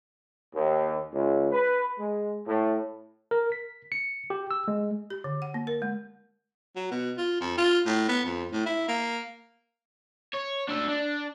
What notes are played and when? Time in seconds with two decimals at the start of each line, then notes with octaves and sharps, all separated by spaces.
0.54 D#2
1.13 C#2
1.51 B4
1.99 G#3
2.47 A2
3.31 A#4
3.52 B6
3.92 C#7
4.30 G4
4.51 E6
4.68 G#3
5.10 G4
5.24 D3
5.42 F#5
5.54 A#3
5.67 A#4
5.82 G#3
6.76 F#3
6.91 B2
7.17 F4
7.41 F2
7.57 F4
7.86 A2
8.08 B3
8.25 F2
8.52 A2
8.66 E4
8.88 A#3
10.34 C#5
10.69 D4 E5
10.89 D4